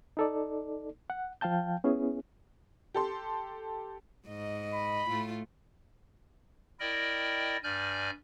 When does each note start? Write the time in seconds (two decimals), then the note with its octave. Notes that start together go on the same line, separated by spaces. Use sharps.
0.17 D#4 A4 D5
1.10 F#5
1.41 F3 F5 G5 A5 G6
1.84 B3 C#4 E4 G#4
2.94 G4 A4 C6
4.27 G#2 D#5
4.74 B5
5.09 A2 A3 F4
6.80 E4 A#4 D5 D#5 G5
7.64 G2 D5 G#5 F6 G6